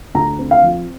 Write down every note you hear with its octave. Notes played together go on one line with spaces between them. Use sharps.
D2 A#5
C4
F5
F3